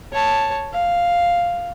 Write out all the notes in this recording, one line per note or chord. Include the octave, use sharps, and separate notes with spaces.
C#5 A5
F5